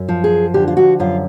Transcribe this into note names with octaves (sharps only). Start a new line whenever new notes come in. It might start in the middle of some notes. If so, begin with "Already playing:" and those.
Already playing: F#2
F3
G#4
D3 G4
F4
F#4
F#2 F4